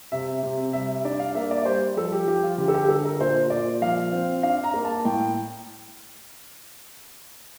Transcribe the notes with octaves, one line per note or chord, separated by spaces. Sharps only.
C3 E5
C3
G3 E5
E5
D4 D5
F5
A#3 E5
D5
G3 C5
F3 A4
G4
F3 G4
F4
D3 G4
A4
G4
D3 A4
A#4
A#2 C5
A#2 D5
F3 F5
C4
D4 F5
A#5
A#3
A5
A2 G5